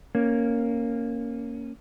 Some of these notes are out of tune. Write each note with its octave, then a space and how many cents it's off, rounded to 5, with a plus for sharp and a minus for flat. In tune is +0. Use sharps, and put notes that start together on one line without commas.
A#3 +0 C#4 +0